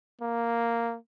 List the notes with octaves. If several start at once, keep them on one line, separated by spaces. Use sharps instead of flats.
A#3